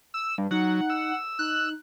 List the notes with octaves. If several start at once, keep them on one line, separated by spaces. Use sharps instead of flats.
E6
G2
F#3 D#4 F#5
E6
D#4 F#6